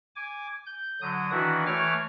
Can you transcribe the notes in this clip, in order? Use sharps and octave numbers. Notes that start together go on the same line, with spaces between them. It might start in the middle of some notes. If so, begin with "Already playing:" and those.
G#5 D6
G6
D3 F#3 D#6
D#3 E3 D4 E4 F#4
E3 A3 C#5 D6 F6